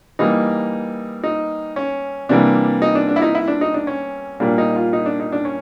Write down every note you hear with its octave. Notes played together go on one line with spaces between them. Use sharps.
E3 G3 A#3 D#4
D#4
C#4
C3 E3 G3 A#3 D4
D#4
D4
D4
E4
D#4
E4
D4
D#4
D4
C#4
A#2 G3 A#3 D4
D#4
F4
D#4
D4
D#4
D4
C#4